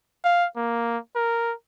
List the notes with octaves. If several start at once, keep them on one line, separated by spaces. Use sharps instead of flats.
F5
A#3
A#4